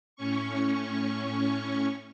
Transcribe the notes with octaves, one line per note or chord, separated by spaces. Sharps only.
A2 C#4 C#6